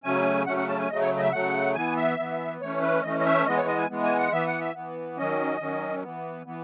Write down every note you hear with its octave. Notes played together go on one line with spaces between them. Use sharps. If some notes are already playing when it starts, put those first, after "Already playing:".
C#3 F#3 A3 C#4 G#5
C#3 F#3 A3 C#4 F#5
F#5
A5
G#5
C#3 F#3 A3 D#5
C#5
D#5
E5
C#3 F#3 A3 F#5
E3 B3 G#5
E5
E3 B3
E3 A3 C#4 C#5
B4
E3 A3 C#4 D#5
D#5
E5
E3 G#3 B3 D#5
C#5
D#5
G#5
E3 G#3 B3
G#5
F#5
E3 B3 E5
F#5
E5
E3 B3
D#3 F#3 C#4 D#5
D#3 F#3 C#4
E3 B3
E3 B3